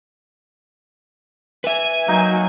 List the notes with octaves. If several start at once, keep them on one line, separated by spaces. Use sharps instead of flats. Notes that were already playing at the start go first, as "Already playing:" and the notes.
B4 E5 G#5
F#3 A#3 D#4 G5